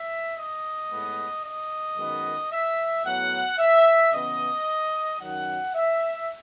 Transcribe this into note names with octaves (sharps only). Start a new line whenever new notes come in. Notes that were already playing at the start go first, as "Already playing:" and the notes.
Already playing: E5
D#5
A2 G#3 B3
D#5
F#2 D#3 G#3 B3
E5
A2 F#3 B3 F#5
E5
C#3 E3 B3 D#5
F#2 D#3 F#3 F#5
E5